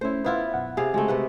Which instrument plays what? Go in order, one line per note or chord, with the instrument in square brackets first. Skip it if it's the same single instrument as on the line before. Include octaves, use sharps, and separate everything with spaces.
[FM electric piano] A3 C#4 [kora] E4 C5
[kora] B3 E4 F4 [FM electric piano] B4 F5 F#5
[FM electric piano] F#2 B2 F#5
[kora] C3 G#4 F5
[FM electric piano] C#3 F#4 [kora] G#3 A3
[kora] C3 B4 F#5